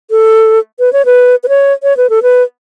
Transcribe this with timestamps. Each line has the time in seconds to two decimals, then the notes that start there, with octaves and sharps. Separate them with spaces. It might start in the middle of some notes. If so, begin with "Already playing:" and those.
0.11 A4
0.79 B4
0.93 C#5
1.05 B4
1.43 B4
1.49 C#5
1.83 C#5
1.97 B4
2.10 A4
2.22 B4